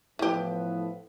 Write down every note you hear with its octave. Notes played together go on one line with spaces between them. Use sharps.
A2 E3 F3 B3 E4 G4 B4 E5